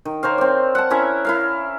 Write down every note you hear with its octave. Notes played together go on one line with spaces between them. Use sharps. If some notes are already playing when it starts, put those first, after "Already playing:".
D#3
A#4 C5 C#5 F5
C4 D5
F#5 A5
C#4 E4 A#4 E5
E4 A#4 F5